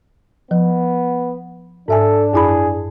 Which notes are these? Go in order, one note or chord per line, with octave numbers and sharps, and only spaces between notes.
F3 B3
G#2 D4 A4 E5 G#5
F#2 E4 G#4 B5